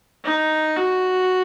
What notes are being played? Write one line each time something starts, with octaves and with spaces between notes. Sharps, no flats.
D#4
F#4